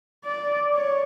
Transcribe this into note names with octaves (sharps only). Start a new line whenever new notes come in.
D5
C#5